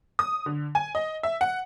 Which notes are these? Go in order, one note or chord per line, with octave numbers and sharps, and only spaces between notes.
D#6
D3
G#5
D#5
E5
F#5